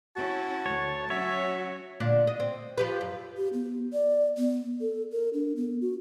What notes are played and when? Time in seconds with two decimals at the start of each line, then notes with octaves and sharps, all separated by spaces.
0.16 C#4 E4 F#4 A5
0.66 D2 C#5
1.10 F#3 C#4 F#4 C#5 E5
2.00 A#2 D3 D4
2.27 D#5
2.40 C4
2.78 F3 G4 B4
3.01 F#2
3.37 G4
3.53 B3
3.93 D5
4.38 B3
4.81 A4
5.12 A#4
5.34 D4
5.56 B3
5.81 F#4